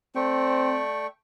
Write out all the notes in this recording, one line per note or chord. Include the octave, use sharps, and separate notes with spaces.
A3 C4 D5 G5 C#6